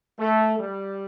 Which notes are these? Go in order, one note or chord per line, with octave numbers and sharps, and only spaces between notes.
A3
G3